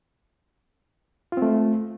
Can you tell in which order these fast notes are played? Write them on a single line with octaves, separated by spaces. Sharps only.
F4 C4 A3